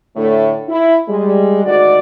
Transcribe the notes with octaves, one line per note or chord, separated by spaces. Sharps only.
A2 D3 A3
E4
G3 G#3
D2 G#2 D#3 F#4 D5